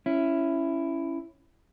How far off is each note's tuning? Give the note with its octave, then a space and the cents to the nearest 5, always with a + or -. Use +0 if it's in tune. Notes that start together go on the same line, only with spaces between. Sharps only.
C#4 +0 E4 +10